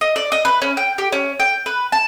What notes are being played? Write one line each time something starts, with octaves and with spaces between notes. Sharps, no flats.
D#5
D5
D#5
B4
C#4
G5
G4
C#4
G5
B4
A5